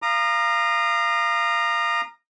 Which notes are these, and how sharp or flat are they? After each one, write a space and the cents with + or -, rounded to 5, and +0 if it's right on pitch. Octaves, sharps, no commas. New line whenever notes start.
F5 -20 A#5 +0 D#6 -40